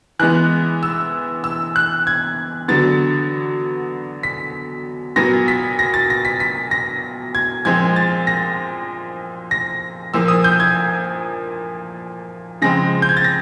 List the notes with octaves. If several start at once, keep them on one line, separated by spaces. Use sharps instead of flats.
E3 G#3 B3 F#6
E6
E6
F#6
G#6
D3 F#3 B3 A6
B6
A#2 F#3 B3 A#6
B6
A#6
A6
A#6
B6
B6
A#6
G#6
A#2 F3 G#3 C4 G#6
A6
A#6
A#6
A#2 F3 A#3 E6
D#6
G6
G#6
C#3 F3 G#3 C4 A#6
G6
G#6
A6
A#6